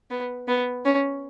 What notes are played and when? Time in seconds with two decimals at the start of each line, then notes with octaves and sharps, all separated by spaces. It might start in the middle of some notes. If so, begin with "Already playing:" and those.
0.10 B3
0.48 B3
0.85 C#4